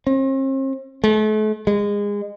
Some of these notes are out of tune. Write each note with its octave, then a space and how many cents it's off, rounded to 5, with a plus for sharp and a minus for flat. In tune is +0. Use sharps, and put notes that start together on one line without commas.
C4 +45
A3 -40
G#3 -25